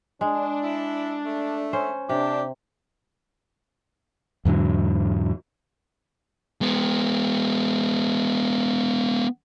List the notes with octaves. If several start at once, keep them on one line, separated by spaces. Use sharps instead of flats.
G#3 D4
E4
A3
C#4 C5
C3 D4 G4
E2 G#2 D3 F#3
G#3 B3